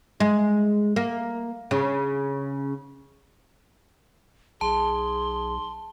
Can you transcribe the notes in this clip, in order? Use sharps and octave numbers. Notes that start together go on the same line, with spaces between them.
G#3
A#3
C#3
B1 G#4 A5 C6